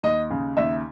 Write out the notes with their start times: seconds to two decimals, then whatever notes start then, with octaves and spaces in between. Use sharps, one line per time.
0.03 D#2 D#5
0.31 C#3
0.57 D#2 E5